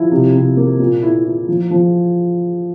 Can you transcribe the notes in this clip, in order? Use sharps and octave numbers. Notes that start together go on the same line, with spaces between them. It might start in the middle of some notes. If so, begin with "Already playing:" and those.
Already playing: F3 E4
C3
C3
A#3
A#2
E4
E4
F3
F3